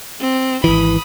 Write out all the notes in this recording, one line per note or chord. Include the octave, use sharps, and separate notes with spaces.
C4
G#1 E3 B5 D#6